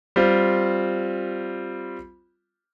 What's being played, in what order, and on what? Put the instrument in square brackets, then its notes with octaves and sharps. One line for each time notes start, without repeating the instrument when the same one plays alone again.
[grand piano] G3 C4 F4